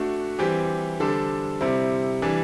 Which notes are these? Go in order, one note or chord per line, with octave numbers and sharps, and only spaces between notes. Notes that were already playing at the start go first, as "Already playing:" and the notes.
Already playing: A3 D4 F#4
E3 G3 C4 G4
D3 G3 D4 A4 C5
C3 G3 C4 E4
E3 G3 D4